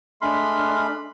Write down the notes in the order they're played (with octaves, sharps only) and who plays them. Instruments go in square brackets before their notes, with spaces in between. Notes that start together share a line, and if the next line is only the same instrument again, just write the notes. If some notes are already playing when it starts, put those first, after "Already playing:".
[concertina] G#3 A3 B5 [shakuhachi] D4 [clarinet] C6 [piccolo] F6